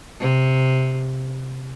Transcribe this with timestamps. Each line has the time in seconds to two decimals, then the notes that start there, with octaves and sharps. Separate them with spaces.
0.21 C3